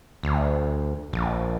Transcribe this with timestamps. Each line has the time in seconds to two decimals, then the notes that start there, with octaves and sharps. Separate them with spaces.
0.23 D2
1.13 A#1